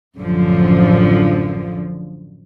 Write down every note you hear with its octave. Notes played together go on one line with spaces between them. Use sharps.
A1 F#2 D3 F3